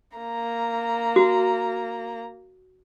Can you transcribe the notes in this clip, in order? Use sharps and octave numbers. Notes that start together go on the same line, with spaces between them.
A#3 A#5
F#4